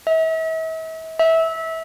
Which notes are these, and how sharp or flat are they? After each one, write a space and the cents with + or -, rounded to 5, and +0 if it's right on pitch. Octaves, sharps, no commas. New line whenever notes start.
E5 -40
E5 -20